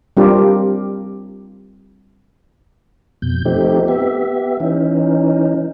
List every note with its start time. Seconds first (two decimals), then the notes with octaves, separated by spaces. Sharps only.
0.17 G3 C4 D4 F4 G4 A#4
3.22 F2 B2 G6
3.45 F3 A3 C4 D#4 G4
3.88 B3 G4 E5
4.60 E3 C#4 D#4